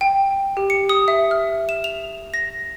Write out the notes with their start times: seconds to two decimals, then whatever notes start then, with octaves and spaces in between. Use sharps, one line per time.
0.01 G5
0.57 G4
0.70 C#7
0.89 D#6
1.08 E5
1.31 F6
1.69 E7
1.84 F7
2.34 A#6